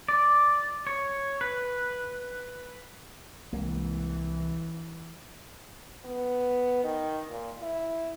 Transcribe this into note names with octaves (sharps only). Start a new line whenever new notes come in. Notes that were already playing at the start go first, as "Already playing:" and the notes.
D5
C#5
B4
C2 E3 G#3 A#3
B3
D#3
A#2
E4